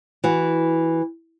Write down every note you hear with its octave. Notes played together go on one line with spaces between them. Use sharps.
E3 F#4